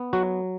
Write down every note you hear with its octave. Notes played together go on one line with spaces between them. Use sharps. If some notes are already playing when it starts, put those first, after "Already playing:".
Already playing: B3
F#3 F#4